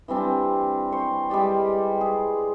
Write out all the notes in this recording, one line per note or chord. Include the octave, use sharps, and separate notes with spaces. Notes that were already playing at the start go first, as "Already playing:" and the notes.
E3 G3 C4 D4
C5 C#6
G3 G#3 G4 D5
G#4